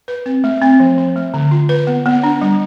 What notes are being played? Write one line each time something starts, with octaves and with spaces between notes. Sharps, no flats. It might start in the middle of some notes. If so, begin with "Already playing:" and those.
B4
C4
A3
C4
F3
F3
A3
D3
F4
B4
B3
B3
D4
G3